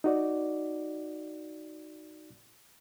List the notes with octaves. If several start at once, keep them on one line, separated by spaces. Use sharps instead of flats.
D#4 F#4 D5